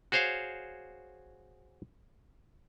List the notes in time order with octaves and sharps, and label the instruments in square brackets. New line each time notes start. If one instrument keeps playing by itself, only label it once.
[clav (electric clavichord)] F#4 G#4 C5 C#5 F5